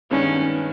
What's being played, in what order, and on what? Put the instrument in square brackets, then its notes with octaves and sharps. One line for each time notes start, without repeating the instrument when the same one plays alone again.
[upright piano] G2 D#3 G#3 B3 D4 [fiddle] C#4